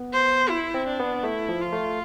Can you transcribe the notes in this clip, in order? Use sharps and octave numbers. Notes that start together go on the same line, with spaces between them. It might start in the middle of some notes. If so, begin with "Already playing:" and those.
Already playing: B3
C5
E4
C4
D4
B3
A3 E4
F3
F4
A3